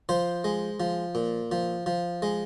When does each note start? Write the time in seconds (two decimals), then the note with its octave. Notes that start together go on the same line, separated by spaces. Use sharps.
0.09 F3 C5
0.44 G#3
0.80 F3
1.15 A#2
1.52 F3
1.86 F3
2.22 G#3